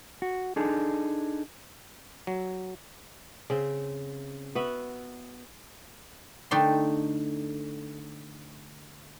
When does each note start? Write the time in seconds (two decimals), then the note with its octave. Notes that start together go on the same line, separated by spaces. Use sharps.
0.22 F#4
0.56 D4 D#4 G#4 A4
2.27 F#3
3.50 C#3 C4
4.55 B3 F#4 B4 E5
6.51 D3 A3 D#4 D5 G5 C6